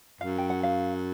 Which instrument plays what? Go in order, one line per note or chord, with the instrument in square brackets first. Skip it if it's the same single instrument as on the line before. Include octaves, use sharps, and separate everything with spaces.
[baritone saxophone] F#2 [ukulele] F5
[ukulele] G5
F#5
F5